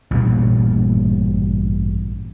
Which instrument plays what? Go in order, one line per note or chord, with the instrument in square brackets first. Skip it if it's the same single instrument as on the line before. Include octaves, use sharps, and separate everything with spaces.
[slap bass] A1 G2 A#2 G3